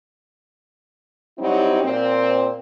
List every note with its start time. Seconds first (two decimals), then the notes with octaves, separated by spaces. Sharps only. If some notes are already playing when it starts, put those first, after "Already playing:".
1.38 F#3 G3 C4 D#4 E4
1.82 A#2 C4